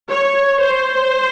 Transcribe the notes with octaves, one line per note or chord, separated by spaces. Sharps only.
C#5
C5